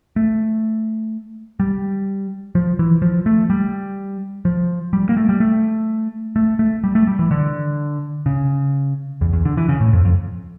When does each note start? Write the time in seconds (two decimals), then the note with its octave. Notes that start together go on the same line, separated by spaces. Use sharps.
0.16 A3
1.60 G3
2.55 F3
2.79 E3
3.02 F3
3.26 A3
3.50 G3
4.45 F3
4.93 G3
5.09 A#3
5.17 A3
5.29 G3
5.40 A3
6.36 A3
6.59 A3
6.84 G3
6.95 A3
7.07 G3
7.19 E3
7.31 D3
8.26 C#3
9.21 E2
9.33 E2
9.45 D3
9.57 E3
9.68 C#3
9.80 A2
9.93 F2
10.05 F2